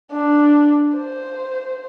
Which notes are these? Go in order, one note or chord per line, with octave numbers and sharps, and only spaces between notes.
D4
C5